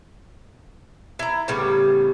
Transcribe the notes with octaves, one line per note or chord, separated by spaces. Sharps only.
E4 A#5
A2 C#3 G3 B3